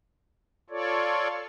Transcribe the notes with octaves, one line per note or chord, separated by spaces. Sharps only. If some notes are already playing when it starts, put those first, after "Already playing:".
F4 A4 C#5 D5